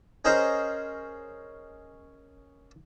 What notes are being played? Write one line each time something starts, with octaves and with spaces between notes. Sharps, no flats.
C#4 G#4 A#4 C5 D#5